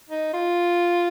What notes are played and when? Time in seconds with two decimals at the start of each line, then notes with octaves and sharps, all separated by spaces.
0.09 D#4
0.33 F4